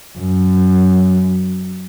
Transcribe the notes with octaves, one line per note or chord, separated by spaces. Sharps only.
F#2